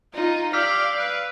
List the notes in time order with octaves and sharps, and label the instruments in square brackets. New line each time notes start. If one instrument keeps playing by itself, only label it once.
[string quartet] D#4 [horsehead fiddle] F4
[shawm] G4 [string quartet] D5 [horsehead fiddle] F5 [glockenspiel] E6 F6 B6
[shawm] B4